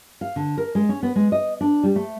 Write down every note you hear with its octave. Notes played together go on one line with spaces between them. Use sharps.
F5
D3
A#4
G#3
C#4
B3
G#3
D#5
D4
G3
A3